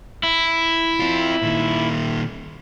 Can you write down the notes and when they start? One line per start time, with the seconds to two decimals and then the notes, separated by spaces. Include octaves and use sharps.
0.23 E4
1.00 C4 F4
1.42 A#2 D#3